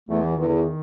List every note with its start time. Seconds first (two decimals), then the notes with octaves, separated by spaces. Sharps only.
0.09 E2 A3
0.22 E3
0.37 E2 D#3
0.47 D3
0.56 D#3